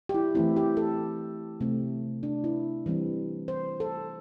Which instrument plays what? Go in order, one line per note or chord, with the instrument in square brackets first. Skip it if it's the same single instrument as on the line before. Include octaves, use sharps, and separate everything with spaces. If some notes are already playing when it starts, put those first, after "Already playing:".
[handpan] G4
E4
E3 A3 C4 E4
G4
A4
C3 A3 C4
D4
E4
E3 G3 C4
C5
A4